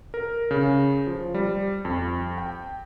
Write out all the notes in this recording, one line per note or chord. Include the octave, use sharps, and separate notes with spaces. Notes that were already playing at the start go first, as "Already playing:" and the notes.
A#4
C#3
F3
G3
F2
G5